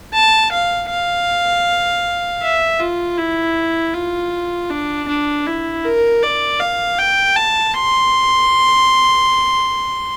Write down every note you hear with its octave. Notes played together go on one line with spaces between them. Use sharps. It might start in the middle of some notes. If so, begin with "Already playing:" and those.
A5
F5
F5
E5
F4
E4
F4
D4
D4
E4
A#4
D5
F5
G5
A5
C6